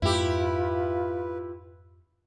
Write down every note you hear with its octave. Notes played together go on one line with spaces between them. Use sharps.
F2 G#2 G#3 E4 F4 G4 B4